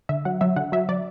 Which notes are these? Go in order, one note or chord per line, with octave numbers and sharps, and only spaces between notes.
D3 E5
F#3 F#5
F#3 E5
D3 F#5
F#3 E5
F#3 D5